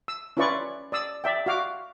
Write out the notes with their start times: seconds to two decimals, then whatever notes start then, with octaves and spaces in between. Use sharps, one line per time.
0.08 E6
0.37 C#4 E4 F4 B4 D5 C#6
0.92 D5 D#6 E6
1.24 D5 E5 G5
1.46 F#4 F5 D6